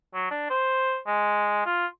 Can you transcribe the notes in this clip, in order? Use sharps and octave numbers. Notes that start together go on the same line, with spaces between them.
F#3
D4
C5
G#3
F4